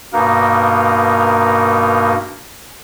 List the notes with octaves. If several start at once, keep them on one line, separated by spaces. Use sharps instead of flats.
G2 B2 A#3 D#4 A#4